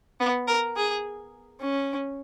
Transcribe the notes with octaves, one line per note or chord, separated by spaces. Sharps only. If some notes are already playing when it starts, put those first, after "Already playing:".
B3
A#4
G#4
C#4